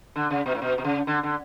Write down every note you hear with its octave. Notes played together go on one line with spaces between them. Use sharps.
D3
C#3
B2
A2
B2
B2
C#3
D3
D3